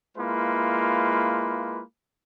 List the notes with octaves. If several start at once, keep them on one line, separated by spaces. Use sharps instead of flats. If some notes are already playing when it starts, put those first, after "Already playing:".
G#3 A#3 E4 F4 B4